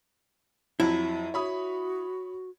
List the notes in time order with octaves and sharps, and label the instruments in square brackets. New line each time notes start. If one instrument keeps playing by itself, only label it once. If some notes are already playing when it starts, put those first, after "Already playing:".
[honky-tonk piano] F2 F#3 A5 [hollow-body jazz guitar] E4
[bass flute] F#4 [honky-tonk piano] C#5 B5 D#6